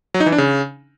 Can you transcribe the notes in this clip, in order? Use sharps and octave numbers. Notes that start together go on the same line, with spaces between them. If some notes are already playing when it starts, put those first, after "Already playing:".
F#3
D#4
E3
D4
C#3